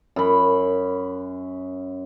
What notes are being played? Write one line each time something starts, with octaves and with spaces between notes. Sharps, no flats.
F#2 B5